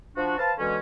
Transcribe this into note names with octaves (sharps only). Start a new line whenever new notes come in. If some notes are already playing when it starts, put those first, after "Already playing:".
F3 D4 F#4
B4 C5 F5 A5
B2 D3 E3 G#3 C#4